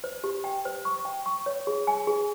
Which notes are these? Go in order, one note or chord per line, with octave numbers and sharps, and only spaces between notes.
C5
G4
G5
C5
C#6
G5
C#6
C#5
G#4
G#5
G#4